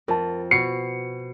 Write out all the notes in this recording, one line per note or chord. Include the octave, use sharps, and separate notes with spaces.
F2 A#4 A5
B2 C7 C#7